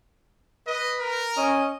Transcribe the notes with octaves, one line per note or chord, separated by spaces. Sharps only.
B4 D#5
A#4
C#4 D#5